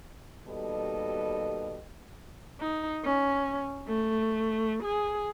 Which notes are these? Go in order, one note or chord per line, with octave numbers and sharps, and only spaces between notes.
D#2 B2 G3 A4 D#5
D#4
C#4
A3
G#4